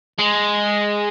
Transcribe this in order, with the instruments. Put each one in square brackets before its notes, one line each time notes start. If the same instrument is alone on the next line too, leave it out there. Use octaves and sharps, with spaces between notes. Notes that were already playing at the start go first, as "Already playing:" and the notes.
[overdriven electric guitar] G#3